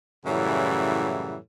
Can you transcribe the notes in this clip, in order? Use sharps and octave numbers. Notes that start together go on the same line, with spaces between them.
F#2 A2 C#3 E3 G3